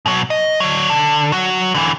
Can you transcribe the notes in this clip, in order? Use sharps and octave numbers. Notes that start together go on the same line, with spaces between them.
B2 F#3
D#5
D3 F#3
D3
F#3 F#4
D3 E3